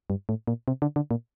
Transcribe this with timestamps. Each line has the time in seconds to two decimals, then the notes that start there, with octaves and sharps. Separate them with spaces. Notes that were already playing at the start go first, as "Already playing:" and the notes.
0.10 G2
0.29 A2
0.47 A#2
0.68 C3
0.82 D3
0.96 D3
1.11 A#2